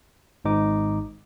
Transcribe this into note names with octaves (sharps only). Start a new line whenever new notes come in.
G#1 G#2 D#4 D6